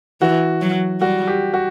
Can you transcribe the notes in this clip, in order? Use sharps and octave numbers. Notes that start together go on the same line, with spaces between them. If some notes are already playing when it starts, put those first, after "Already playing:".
E3 F#4
F#3
G3 F#4
G4
F#4